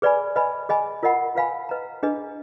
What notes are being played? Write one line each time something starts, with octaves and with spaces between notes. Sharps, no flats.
G#4 B4 D5 G#5 B5
B4 D#5 G#5 B5
G#4 D#5 G#5 B5
F4 A#4 D#5 F#5 B5
F4 B4 F5 G#5 B5
B4 D#5 A#5
D4 G#4 B4 D#5